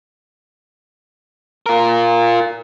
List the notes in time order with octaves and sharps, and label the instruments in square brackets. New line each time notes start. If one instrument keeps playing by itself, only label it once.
[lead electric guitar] F4 A#4